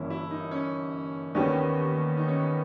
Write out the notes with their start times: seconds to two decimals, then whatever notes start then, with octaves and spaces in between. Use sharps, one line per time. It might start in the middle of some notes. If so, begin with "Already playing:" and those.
Already playing: G1 G2 E3 A#3 C#4 E4
0.10 E4
0.31 D#4
0.51 C#4
1.35 D#2 D#3 G3 B3 C#4
2.17 D#4
2.28 C#4
2.39 B3